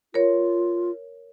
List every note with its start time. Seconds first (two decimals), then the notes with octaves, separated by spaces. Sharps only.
0.14 F4 A#4 C#5